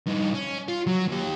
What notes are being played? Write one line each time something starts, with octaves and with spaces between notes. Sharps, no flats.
G2 D#4
C#4
F4
F#3
D#2 G4